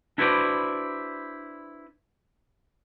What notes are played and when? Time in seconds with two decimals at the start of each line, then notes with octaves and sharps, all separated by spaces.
0.18 D4 E4 F#4 B4 C5 D5